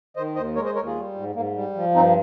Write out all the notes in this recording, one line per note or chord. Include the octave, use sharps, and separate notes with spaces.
D#3 C5 D#5
D#2 C5 D#5
G#3 A#4 C#5
C5 D#5
D#2 A#4 C#5
F4 G#4
G3
G#2
G#2 A#3
G3
F3
G2 C4 D#4